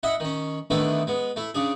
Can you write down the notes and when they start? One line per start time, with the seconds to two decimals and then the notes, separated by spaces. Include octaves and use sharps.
0.03 E4 D#5 E5 F#5
0.20 D#3 C#4
0.70 D3 D#3 A3 B3 D4 E4
1.07 G#3 B3
1.36 A3 E4
1.55 C#3 D4 G#4